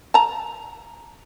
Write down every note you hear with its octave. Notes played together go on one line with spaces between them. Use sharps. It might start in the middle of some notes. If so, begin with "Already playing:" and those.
A5 A#5